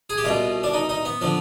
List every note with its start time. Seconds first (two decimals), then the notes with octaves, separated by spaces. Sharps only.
0.10 G#4
0.18 G4
0.24 C2 B2 F4
0.64 D4
0.74 D#4
0.89 D#4
1.05 B3
1.21 D3 F3